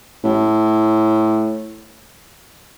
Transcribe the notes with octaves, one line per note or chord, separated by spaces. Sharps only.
A2